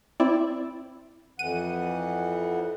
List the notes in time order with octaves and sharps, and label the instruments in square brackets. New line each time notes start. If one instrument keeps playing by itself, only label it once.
[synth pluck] C4 E4 D5
[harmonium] F2 E3 F#5 [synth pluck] D#7